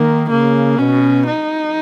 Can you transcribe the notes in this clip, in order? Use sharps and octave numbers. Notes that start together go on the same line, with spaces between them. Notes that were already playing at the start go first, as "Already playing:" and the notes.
Already playing: D#3 A#3
C#3 A#3
B2 C#4
D#4